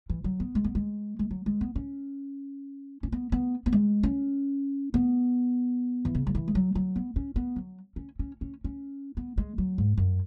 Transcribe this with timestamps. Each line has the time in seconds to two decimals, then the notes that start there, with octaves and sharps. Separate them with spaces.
0.10 E3
0.24 F#3
0.40 B3
0.55 G#3
0.64 B3
0.75 G#3
1.19 G#3
1.31 F#3
1.46 G#3
1.61 B3
1.76 C#4
3.03 C#4
3.12 B3
3.32 B3
3.66 B3
3.73 G#3
4.03 C#4
4.94 B3
6.05 E3
6.15 C#3
6.27 F#3
6.35 E3
6.48 G#3
6.55 F#3
6.75 F#3
6.96 B3
7.16 C#4
7.36 B3
7.56 F#3
7.96 C#4
8.19 C#4
8.41 C#4
8.64 C#4
9.17 B3
9.38 G#3
9.58 F#3
9.78 G#2
9.98 F#2